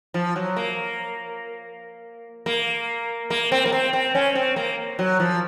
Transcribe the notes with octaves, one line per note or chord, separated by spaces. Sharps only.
F3
F#3
A#3
A#3
A#3
C4
A#3
C4
C4
C#4
C4
A#3
F#3
F3